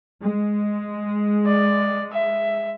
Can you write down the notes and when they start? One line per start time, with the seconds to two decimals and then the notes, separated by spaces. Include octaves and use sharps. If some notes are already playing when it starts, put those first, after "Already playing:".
0.22 G#3
1.46 D5
2.12 E5